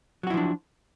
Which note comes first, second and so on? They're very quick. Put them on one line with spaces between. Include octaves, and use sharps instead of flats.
F#3 F#4 E4 F3 D4